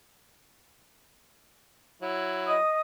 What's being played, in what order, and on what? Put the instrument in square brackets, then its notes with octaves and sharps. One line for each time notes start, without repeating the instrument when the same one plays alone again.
[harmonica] F#3 E4
[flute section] D#5 D#6